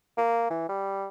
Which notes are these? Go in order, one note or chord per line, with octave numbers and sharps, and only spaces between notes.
A#3
E3
G3